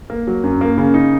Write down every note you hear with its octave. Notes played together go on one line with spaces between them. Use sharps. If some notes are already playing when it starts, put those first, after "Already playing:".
A#3
F#3
F#2
A#3
C#3
D#4